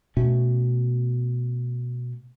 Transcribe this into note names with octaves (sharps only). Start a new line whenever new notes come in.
B2 A3 C#4